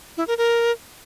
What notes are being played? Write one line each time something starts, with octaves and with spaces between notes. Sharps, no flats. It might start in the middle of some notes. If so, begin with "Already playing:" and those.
E4
A#4
A#4